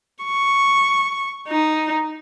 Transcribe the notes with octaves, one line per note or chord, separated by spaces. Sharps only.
C#6
D#4